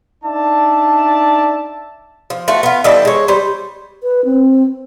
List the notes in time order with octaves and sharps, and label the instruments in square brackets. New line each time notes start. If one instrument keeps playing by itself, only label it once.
[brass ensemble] D4 D#4 D5 E5 A5
[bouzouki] F3
A3 F4 F#4 A4
B3 F4
E3 G3 A4 D#5
G#3 C#5
G3 C5
[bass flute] B4
C4